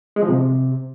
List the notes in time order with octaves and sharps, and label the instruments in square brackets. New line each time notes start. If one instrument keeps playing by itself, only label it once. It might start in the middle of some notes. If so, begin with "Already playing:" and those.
[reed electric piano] G#3
F3
C3